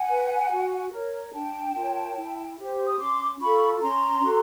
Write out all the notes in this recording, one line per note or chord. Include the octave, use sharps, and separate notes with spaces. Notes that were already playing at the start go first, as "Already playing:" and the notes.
Already playing: F#5 G#5
B4
F#4
A#4 C#5
D4 G5 A5
F4 A#4 C#5
E4
G4 C5
D#6
C#4 C6 D6
F4 A4 B5 C#6
C#4 A#5 C6
F#4 A4